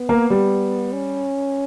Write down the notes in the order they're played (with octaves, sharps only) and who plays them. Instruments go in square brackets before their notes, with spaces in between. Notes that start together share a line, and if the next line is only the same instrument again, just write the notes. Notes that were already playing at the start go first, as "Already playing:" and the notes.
Already playing: [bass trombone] B3
[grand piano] A#3
G3
[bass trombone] C#4